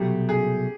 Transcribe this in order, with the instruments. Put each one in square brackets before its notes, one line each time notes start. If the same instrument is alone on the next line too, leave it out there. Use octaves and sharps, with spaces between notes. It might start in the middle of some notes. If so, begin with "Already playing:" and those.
Already playing: [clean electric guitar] C2 B2 F#3 A3 [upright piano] G4
[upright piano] G#4